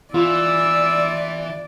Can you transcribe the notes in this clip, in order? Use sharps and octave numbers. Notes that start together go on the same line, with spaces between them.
E3 F4 D5 E6